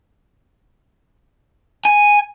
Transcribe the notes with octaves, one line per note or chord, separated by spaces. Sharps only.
G#5